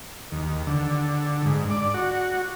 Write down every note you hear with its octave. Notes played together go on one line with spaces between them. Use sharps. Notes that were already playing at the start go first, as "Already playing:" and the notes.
D#2
D3
G#2
D5
F#4